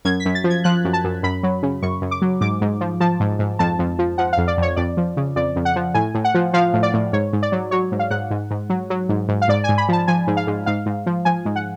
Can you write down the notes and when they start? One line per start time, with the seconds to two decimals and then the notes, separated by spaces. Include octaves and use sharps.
0.05 F#2 G#6
0.20 B6
0.25 F#2
0.35 A6
0.44 F3
0.50 G#6
0.64 F3 F#6
0.85 F#2
0.93 A5
1.04 F#2
1.23 F#2 B5
1.43 F#3
1.63 C#3
1.82 F#2 C#6
2.02 F#2
2.11 D6
2.22 F#3
2.41 G#2 D6
2.61 G#2
2.81 F3
3.00 F3 A5
3.20 G#2
3.39 G#2
3.59 F2 A5
3.79 F2
3.99 F3
4.18 F3 F#5
4.33 F2 F5
4.48 D5
4.57 F2 C#5
4.76 F2 D5
4.97 F3
5.17 C#3
5.36 F2 D5
5.56 F2
5.65 F#5
5.76 F3
5.94 A2 G#5
6.14 A2
6.24 F#5
6.34 F3
6.54 F3 F5
6.74 A2
6.83 D5
6.94 A2
7.13 G#2 C#5
7.33 G#2
7.43 D5
7.52 F#3
7.71 F#3 C#5
7.92 G#2
7.99 F5
8.11 G#2 F#5
8.31 G#2
8.51 G#2
8.70 F#3
8.90 F#3
9.09 G#2
9.28 G#2
9.42 F5
9.48 G#2 D5
9.64 G#2 G#5
9.78 B5
9.89 F3 A5
10.08 F3 G#5
10.27 G#2
10.37 F5
10.47 G#2
10.66 G#2 F5
10.86 G#2
11.06 F3
11.25 F3 G#5
11.45 G#2
11.56 F#5